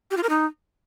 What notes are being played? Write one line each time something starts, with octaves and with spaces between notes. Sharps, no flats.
G4
F4
A#4
D#4